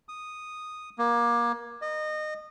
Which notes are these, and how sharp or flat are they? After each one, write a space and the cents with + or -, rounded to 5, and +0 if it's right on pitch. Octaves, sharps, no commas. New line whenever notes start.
D#6 -5
A#3 +25
D#5 -25